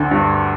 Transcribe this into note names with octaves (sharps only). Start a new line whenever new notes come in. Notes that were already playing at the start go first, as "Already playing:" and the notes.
Already playing: D2 D3
G2